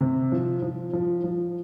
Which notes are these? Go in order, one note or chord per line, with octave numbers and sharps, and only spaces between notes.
C3
F3
F3
F3
F3